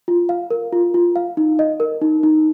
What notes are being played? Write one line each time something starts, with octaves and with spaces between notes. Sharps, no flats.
F4
F5
A#4
F4
F4
F5
D#4
D#5
A#4
D#4
D#4